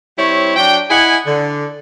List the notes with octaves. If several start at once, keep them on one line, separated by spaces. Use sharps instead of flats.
G3 C4 E4 C#5
F#3 D4 G5
E4 D#5 F#5 G#5
D3